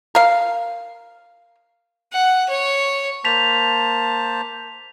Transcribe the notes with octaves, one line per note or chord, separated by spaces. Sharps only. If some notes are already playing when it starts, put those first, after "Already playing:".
A#4 F5
F#5
C#5
A#3 C5 A5 B6 F7